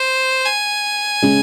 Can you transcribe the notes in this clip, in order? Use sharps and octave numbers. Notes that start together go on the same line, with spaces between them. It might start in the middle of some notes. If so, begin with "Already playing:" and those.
Already playing: C5
G#5
C#3 G#3 C#4